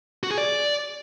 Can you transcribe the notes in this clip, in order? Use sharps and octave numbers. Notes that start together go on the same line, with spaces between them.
F#4
G#4
D5